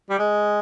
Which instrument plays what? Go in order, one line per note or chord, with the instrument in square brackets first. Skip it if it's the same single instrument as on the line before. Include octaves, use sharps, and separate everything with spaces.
[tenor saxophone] G3
G#3